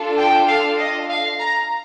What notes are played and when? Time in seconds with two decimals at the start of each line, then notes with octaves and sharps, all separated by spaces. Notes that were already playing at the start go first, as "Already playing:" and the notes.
Already playing: D4 F4 A4
0.17 G5
0.47 F5
0.78 D#5
1.08 F5
1.39 A#5